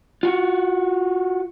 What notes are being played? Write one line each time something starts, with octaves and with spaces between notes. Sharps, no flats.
F4 F#4